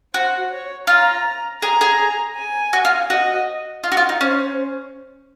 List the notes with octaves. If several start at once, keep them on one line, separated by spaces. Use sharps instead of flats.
F#4 C5
C#5
F4 A#5
G#4 A#5
G#4
G#5
F#4
F4
F#4 D#5
F4
F#4
F4
D#4
C#4 C5